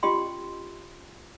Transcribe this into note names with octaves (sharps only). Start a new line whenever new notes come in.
C#4 F4 G4 D#5 G5 C6